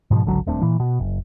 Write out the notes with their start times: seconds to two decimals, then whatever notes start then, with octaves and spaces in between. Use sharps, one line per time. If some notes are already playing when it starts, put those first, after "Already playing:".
0.11 G#2 B2 E3 F3
0.24 G#1 C#2 D3 F#3
0.47 D#1 A3 C4 D4
0.62 A#2 E3
0.80 B2
0.99 F#1